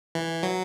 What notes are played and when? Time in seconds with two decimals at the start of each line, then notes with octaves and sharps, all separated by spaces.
0.15 E3
0.43 F#3